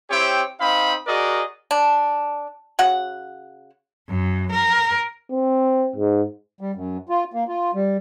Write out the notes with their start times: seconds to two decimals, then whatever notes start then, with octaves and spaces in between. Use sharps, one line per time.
0.10 C4 E4 G4 C#5 G5
0.60 C4 D#4 F5 B5
1.07 F#4 G#4 A#4 D5 D#5
1.71 D4
2.79 C#3 F#4 F#5
4.09 F#2
4.52 A#4
5.31 C4
5.96 G#2
6.61 G3
6.75 F#2
7.09 F4
7.33 A#3
7.48 F4
7.75 G3